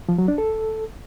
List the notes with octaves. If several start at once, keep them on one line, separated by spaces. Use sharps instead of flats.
F3
F#3
D4
A4